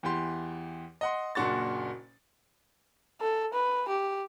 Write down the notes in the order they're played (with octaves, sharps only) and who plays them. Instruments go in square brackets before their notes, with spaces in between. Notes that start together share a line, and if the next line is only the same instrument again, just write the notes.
[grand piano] E2 E3 G4 C6
D#5 F#5 C6
F#1 A#2 D4 F#4 C#6 A6
[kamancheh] A4
B4
G4